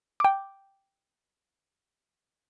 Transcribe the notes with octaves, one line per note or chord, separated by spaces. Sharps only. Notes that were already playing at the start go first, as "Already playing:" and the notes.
G5 D6